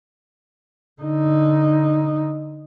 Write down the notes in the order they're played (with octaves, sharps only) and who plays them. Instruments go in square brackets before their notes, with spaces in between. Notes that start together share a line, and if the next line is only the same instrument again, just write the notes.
[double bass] D3 D#4